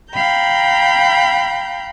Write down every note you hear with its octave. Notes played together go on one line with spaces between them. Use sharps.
F5 G5 A#5 B5 G6